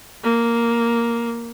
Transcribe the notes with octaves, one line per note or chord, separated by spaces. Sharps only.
A#3